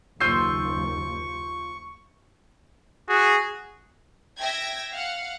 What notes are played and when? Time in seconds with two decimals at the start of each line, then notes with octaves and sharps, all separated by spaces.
0.20 F#1 D#2 F4 C5 C#6 E6 G6 C7
3.09 F#4 G#4
4.41 E5 G5 G#6 A#6
4.94 F5 F#5